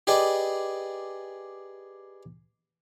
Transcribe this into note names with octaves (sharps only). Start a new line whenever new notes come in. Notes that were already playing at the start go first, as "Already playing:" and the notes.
G4 G#4 B4 D5 D#5